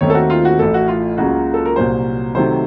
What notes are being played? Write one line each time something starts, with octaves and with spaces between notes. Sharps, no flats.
D#2 D#3 A3 C4 D#4 C#5
A4
F#4
F4
F#4
A1 A2 A3 A4
F#4
F4
C#2 C#3 F#3 A#3 F4 F#4
A4
A#4
C2 A#2 F#3 C5
C3 D#3 F#3 A3 C5